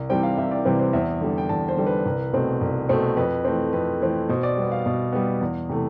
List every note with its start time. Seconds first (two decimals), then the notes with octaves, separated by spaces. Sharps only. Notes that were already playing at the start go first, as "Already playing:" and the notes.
Already playing: C2
0.10 C3 E3 G3 C4 G5
0.23 F5
0.38 C2 E5
0.51 D5
0.65 C3 E3 G3 C4 B4
0.80 C5
0.93 E2 E5
1.21 D3 G3
1.38 G5
1.49 E2 A5
1.68 C5
1.77 D3 G3
1.86 B4
2.06 C2
2.33 B2 A3 C4
2.61 C2
2.89 B2 A3 C4
3.17 F2 B4
3.45 E3 A3 C4
3.73 F2 B4
4.02 E3 A3 C4
4.29 B2 C5
4.43 D5
4.57 G3 B3
4.72 F5
4.86 B2
5.13 G3 B3
5.41 E2
5.69 C3 E3 A3